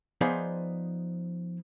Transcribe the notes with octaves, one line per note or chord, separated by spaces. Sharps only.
F3 B3 D#4 G#4 C5 D5